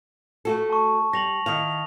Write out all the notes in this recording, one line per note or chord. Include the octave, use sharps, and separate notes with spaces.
A3 F#4 A4
A5 C#6
G3 A#6 F7 F#7
D#3 E4 F5 D#6 F7